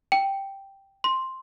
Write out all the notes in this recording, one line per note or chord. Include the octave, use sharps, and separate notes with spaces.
G5
C6